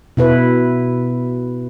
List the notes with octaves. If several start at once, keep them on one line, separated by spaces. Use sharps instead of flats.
B2 E4 B4